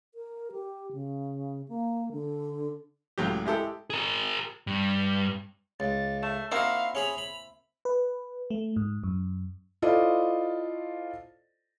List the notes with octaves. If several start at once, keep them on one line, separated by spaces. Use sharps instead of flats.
A#4
G4
C#3
A#3
D3
C#2 A2 F#3 G4
G#3 E4 G4 A4
G#4 A#4
G2
C#2 A6
A3 E7
A#3 C4 D#4 E4 F#4 F5
C#4 G#4 B5 F7
B5
B4
A3
G#2
F#2
E4 F4 A4 C5 D5 D#5